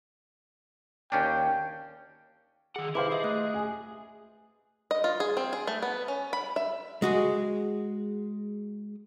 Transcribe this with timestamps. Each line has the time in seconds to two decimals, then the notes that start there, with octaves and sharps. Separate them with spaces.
1.12 D#2 C#4 D4 G5
2.76 D#3 G#4 F#5
2.95 E4 G#4 B4 C5 F5 C6 D6
3.11 G#4 D#5 E5
3.24 A3 F#6
3.54 G#5
4.91 D#5
5.04 F4
5.20 G#4
5.37 C4
5.53 G#4
5.67 A3
5.82 B3
6.08 C#4
6.33 B5
6.56 E5
7.02 G#3 F#4 G#4